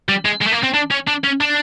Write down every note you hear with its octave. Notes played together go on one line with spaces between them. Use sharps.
G3
G#3
G#3
A3
A#3
C4
D4
C#4
D4
C#4
D4